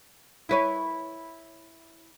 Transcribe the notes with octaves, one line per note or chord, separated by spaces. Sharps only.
E4 B4 C#5